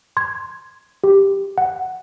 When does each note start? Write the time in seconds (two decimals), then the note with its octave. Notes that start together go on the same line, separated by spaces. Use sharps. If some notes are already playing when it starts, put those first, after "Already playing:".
0.17 C6 G#6
1.04 G4
1.58 F#5